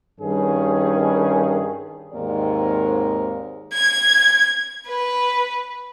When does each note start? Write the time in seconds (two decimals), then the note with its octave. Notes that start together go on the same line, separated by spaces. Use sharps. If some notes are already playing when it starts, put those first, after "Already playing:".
0.20 G2 D#3 C#4 G#4
2.14 D#2 G#2 D#3 C4 A#4 D5
3.73 G#6
4.87 B4